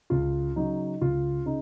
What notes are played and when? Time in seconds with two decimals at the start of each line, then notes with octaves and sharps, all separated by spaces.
0.10 C#2 F4
0.56 C#3 F#3 D#4
1.01 C#2 F4
1.46 C#3 D#4